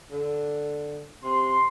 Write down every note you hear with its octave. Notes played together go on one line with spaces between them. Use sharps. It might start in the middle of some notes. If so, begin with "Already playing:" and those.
D3
C3 C6